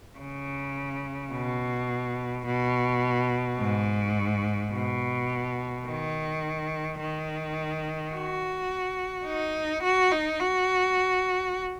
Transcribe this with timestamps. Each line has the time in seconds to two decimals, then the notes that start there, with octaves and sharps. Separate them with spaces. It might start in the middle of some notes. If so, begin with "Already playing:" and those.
0.19 C#3
1.33 B2
2.46 B2
3.59 G#2
4.73 B2
5.86 D#3
7.00 D#3
8.14 F#4
9.26 D#4
9.83 F#4
10.12 D#4
10.40 F#4